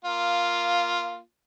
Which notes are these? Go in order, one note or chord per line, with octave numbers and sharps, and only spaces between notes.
A#3 F4